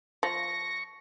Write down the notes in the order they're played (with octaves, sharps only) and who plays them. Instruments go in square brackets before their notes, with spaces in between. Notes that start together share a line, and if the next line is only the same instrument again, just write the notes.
[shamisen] F3 [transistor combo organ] C#6 [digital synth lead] A#6